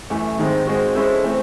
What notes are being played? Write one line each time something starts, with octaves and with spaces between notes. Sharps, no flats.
F#2 E3 A3
G#2 D#3 G#3 C4
G#3 C4 F#4
G#3 C#4 E4 A4 C5
E3 A3 C4